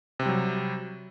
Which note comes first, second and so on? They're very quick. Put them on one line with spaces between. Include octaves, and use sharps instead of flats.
C3 C4 G3 F#3